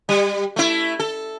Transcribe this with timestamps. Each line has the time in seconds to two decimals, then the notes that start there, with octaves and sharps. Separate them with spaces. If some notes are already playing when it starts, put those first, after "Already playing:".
0.09 G3
0.56 A3 E4
0.99 A4